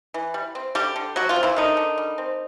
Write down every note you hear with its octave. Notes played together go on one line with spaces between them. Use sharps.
E3
G3
C4
D3 G3 G4
D3
F#3 G3 F#4
F3 F4
C4
E3 E4
D3 D#3 D#4
D3
G3
C4